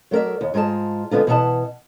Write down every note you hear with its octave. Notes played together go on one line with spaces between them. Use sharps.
F#3 A3 A#4 D5 E5
D#2
G#2 G#3 F4 A#4 A5
D3 G#3 B3 D#4 F4
B2 E3 B3 E5 F#5 A5